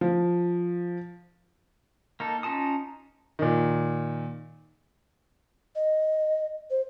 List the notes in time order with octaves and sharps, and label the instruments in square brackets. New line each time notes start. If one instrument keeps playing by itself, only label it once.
[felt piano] F3
[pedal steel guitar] A#3 D#4 A4
C#4 D#4 F4 A5 D#6
[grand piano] A#2 D#3
[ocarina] D#5
C5